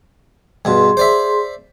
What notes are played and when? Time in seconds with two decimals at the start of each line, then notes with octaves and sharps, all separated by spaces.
0.65 G2 B2 G#4 C6
0.97 C5 D5 E5